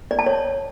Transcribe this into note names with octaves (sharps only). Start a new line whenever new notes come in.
D5
A5
C#5